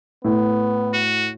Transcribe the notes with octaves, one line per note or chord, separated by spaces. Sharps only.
A2 B3
F#4